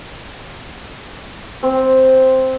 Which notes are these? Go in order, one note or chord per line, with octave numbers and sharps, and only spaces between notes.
C4